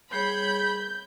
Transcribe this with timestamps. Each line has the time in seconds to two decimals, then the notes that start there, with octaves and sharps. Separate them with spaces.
0.13 G3 G#4 C#5 B5 G6